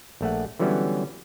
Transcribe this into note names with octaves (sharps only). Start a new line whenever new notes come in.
A#1 A3 F#5
D3 E3 F#3 G3 B3 C#4